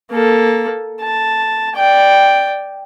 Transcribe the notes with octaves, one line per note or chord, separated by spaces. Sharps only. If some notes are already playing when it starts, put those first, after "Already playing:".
A#3 A4
A5
D5 G5